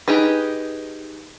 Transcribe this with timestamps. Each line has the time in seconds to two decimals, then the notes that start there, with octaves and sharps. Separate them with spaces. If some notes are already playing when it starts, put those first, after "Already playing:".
0.08 D#4 G4 G#4 B4